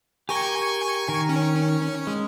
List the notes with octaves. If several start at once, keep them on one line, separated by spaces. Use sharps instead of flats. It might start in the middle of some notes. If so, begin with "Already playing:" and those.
G4 A#4 G5 G#5 C#6
D#3 A#4
C#4
G#3